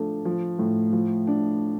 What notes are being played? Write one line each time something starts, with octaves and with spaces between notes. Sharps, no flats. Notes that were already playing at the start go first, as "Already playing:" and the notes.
Already playing: F3 A3 D4
F3
A2
F3
D4